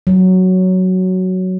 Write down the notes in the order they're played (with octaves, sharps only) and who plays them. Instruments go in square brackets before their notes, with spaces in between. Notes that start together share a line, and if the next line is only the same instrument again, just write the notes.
[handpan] F#3